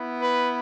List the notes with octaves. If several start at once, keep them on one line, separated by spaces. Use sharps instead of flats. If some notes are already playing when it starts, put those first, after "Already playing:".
Already playing: B3 E4
B4